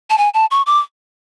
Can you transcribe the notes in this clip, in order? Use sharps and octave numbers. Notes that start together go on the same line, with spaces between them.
A5
G#5
A5
C#6
D6